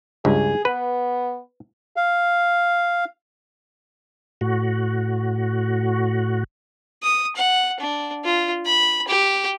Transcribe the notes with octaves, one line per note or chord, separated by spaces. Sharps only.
C#2 G2 G#4
B3 B4
F5
A2 F#4
D#6
F#5
D4
F4
B5
G4